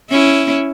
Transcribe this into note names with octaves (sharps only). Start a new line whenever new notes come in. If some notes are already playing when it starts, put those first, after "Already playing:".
C#4 E4